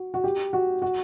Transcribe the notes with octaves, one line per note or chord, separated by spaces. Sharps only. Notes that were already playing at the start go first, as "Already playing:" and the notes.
Already playing: F#4
F#4
G4
F#4
F#4